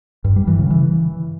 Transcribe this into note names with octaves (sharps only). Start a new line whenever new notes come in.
G2
G3
E3
C#3
E3